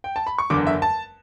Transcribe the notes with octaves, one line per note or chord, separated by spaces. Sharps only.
G5
A5
B5
C#6
F#1 E2 D3 D6
E5
A5